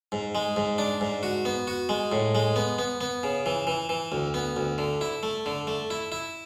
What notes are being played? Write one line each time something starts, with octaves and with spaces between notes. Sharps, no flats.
G#2
G#3
G#2
D4
G#2
F#4
B3
F#4
G#3
A2
G#3
B3
B3
B3
C#3
E3
E3
E3
D2
B3
D2
D3
E4
A3
D3
A3
E4
E4